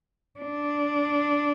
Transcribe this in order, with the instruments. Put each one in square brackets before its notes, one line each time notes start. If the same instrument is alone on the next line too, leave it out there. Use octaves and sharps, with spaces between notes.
[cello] D4